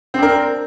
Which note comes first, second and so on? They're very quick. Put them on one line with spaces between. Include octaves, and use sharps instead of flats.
C4 D4 A#4